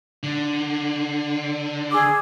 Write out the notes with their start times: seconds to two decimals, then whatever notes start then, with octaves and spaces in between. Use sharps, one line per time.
0.23 D3
1.91 G#4 D6 E6